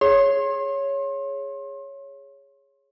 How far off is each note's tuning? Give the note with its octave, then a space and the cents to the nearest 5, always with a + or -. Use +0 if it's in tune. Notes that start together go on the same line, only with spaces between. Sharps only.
G#4 +0 C#5 +0 C6 +35